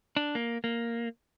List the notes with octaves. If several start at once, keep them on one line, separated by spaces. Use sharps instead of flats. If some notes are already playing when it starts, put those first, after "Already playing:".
D4
A#3
A#3